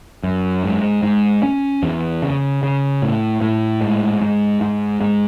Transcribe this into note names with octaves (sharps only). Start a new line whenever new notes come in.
F#2
G#2
G#2
C#4
E2
C#3
C#3
A2
A2
G#2
G#2
G#2
G#2